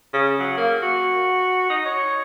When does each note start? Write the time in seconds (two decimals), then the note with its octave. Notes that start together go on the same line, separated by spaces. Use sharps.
0.14 C#3
0.40 F#3
0.57 A#3
0.82 F#4
1.70 D#4
1.85 C#5